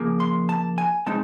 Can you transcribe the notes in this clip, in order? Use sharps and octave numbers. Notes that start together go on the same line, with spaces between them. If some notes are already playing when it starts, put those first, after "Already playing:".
Already playing: C#3 F3 A#3
C6
A5
G#5
B2 G#3 C4 D#4 A5